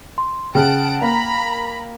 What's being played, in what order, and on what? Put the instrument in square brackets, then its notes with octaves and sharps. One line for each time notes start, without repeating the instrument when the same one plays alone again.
[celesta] C6
[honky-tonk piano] C#3 [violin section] F#5 A5 D7 [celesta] G5 F6
[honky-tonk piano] A#3 [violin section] A#5 B5